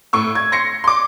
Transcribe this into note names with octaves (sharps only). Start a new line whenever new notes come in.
A2 C#6 E6
G#6
C6 A#6 C7 C#7
C6 D6